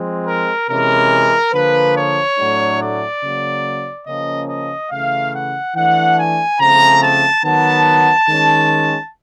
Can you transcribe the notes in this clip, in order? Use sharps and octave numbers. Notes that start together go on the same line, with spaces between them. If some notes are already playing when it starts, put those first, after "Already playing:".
Already playing: F3 G#3 C4
A#4
C3 E3 G#3 C#4 A#4
D3 F3 A#3 B4
C#5
A2 F#3 A3 D4
D5
C#3 F#3 A#3
C#3 F3 A#3 C#4 D#5
D#5
C#3 E3 A3 F5
F#5
E3 A3 D4 F#5
G#5
C#3 F3 A3 C4 A#5
A5
D#3 F#3 B3 A5
D#3 G#3 C#4